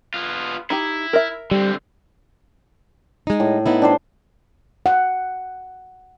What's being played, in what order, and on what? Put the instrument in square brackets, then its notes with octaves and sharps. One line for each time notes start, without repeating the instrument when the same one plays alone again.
[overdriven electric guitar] B3 F4
[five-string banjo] D#4 G4 [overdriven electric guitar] E4
[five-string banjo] A#4 E5
[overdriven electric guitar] D3 C4 [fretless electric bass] G3
[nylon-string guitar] G#3 D#4
[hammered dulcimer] A2
[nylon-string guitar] B3 D#4 E4
[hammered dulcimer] D4 G4 C5
[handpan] F#5